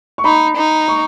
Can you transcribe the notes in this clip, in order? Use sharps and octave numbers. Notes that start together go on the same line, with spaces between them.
C#6
D#4 B5
D#4
C#6